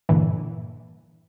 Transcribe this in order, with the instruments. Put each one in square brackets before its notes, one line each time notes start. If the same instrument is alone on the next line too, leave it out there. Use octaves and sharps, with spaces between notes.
[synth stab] G2 A#2 D3 E3